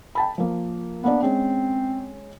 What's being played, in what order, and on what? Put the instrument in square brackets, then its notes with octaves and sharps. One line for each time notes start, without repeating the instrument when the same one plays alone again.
[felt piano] G5 A5 B5
F3 A#3
[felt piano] A#3 D4 D5 [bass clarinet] B3
[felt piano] G#3 C#4 [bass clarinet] C4